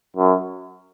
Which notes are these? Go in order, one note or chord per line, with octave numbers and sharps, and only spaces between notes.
F#2